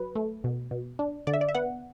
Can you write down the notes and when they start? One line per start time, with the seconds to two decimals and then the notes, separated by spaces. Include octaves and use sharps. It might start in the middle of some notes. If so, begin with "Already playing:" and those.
Already playing: F#3 B4
0.15 A3
0.44 B2
0.71 B2
0.99 D4
1.27 D3 D5
1.33 E5
1.41 D5
1.49 E5
1.55 B3 F#5